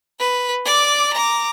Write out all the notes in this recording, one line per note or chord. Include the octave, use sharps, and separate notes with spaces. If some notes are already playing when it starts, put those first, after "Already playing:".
B4
D5 D6
A#5 D6